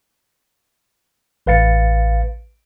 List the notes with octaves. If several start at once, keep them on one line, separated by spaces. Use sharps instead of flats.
A1 B4 F5 A6 C#7